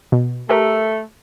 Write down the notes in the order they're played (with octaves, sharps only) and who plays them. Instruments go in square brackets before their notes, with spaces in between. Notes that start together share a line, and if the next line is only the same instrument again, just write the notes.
[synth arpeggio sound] B2
[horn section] A3 [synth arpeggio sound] G4 A#4